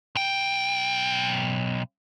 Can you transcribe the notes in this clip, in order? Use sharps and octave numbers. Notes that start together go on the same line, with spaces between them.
B1 G5